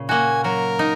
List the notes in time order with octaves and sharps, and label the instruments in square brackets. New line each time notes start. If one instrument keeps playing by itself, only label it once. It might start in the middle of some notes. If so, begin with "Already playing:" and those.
Already playing: [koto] A#2 C#3
[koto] A#3 F#4 [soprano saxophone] G#5
[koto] F#3 [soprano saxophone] A#4
[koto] D#4